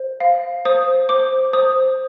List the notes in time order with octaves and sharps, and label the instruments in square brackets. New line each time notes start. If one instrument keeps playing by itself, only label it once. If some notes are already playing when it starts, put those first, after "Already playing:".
Already playing: [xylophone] C5
F5
C5 D#6
C5 D6
C5 D#6